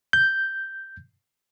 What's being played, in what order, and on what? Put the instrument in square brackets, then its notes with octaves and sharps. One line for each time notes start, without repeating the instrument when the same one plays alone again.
[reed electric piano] G6